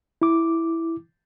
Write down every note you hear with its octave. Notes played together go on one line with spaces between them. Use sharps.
E4 D6